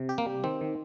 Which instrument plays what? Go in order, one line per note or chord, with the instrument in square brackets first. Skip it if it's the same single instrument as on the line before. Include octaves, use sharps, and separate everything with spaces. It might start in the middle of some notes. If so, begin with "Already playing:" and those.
Already playing: [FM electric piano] C3
G4
[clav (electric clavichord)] A#3
[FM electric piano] G3
[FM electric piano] D#3 [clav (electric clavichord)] C4
[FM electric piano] D#3